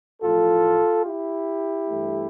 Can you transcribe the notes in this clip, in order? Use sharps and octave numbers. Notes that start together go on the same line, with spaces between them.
A1 A2 F3 F4 A4
E4 G4
G2 E3 A3